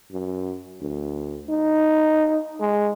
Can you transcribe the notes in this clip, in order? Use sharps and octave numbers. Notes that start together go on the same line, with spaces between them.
F#2
D2
D#4
G#3